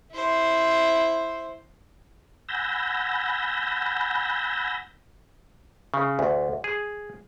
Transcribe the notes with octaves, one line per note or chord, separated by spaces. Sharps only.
E4 C5
F#5 G#5 B5 E6 G6 A#6
C#3
D2
G#4